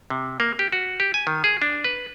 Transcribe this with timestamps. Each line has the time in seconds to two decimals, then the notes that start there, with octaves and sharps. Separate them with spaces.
0.10 C3
0.40 A#3
0.59 G4
0.72 F#4
1.00 G4
1.14 G#5
1.27 D#3
1.44 G#4
1.62 D4
1.84 B4